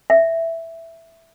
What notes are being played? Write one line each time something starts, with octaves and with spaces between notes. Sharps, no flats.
E5